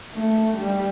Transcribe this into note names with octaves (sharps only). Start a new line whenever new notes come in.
A3
G3